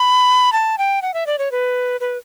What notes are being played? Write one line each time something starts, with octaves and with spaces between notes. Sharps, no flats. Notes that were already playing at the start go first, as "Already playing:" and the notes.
Already playing: B5
A5
G5
F#5
E5
D5
C#5
B4
B4